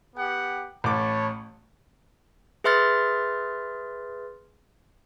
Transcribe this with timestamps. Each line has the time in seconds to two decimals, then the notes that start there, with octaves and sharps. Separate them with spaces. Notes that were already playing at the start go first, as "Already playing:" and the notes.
0.16 B3 G4 F#5
0.84 A1 C#5 A5 B5 D6
2.64 G#4 B4 E5 C6 F6 A6